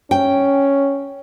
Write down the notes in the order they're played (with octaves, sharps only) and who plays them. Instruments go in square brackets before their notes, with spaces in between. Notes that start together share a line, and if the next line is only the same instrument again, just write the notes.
[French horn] C#4 [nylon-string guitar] G5